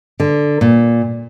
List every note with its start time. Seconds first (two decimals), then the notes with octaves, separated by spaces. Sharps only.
0.20 D3
0.61 A#2